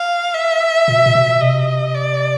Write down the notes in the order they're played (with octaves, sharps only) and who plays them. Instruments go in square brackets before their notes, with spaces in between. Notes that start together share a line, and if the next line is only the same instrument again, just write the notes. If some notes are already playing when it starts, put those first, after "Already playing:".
Already playing: [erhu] F5
E5
[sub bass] A#2
B2
A#2
B2
[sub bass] C3 [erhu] D#5
[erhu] D5